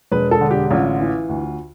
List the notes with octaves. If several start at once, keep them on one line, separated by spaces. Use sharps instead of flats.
E1 B4
A4
D3
G4
A1 F4
E3
D2